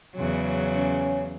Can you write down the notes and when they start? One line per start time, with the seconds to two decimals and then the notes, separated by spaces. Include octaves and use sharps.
0.15 E2 C#3 F#3
0.76 C#4